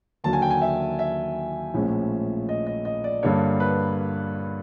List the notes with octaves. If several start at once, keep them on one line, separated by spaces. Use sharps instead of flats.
D#2 D3 F#3 A5
G#5
G5
G#5
E5
E5
A#1 A2 F3 G#3 C#4
D#5
D#5
D#5
D5
G2 D3 G3 A#3 C#5
B4